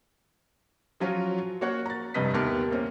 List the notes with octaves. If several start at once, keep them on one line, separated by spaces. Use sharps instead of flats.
F3 F#3 C#4 F4 F#4
A#3 F#4 C#5 F#5
A#5 A6
F1 C2 G2 B4 D#5 B6
D#2 A3 B3 A#4 A5 D6
A#3 C4 C#4